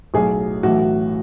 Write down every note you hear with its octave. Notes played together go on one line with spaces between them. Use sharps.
B1 A2 F#3 G#4
B1 A2 E3 F#4